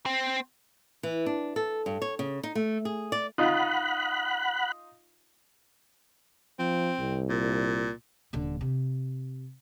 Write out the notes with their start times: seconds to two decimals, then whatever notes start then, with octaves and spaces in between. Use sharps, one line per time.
0.06 C4
1.03 E3
1.26 D4
1.56 A4
1.86 G2
2.02 C#5
2.19 C#3
2.43 D#4
2.55 A3
2.85 G#4
3.12 D5
3.38 D#4 F4 F#5 B5 F#6
6.59 F3 C4
7.00 C2
7.29 A#2
8.33 D#1 D3
8.61 C3